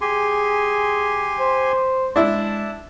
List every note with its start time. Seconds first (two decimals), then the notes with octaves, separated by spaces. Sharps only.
0.01 G4 G#4 G#5 C6
1.39 C5
2.16 G#3 D4 E4 A5